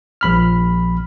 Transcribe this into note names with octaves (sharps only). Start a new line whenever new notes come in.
A#1 B5 F6